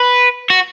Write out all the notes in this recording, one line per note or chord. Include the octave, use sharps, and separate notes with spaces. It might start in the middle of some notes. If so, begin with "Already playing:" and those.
Already playing: B4
F#4